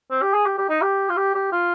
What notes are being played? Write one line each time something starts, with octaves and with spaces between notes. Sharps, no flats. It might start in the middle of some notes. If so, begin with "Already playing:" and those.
C4
G4
G#4
G4
G4
D#4
G4
F4
G4
G4
F4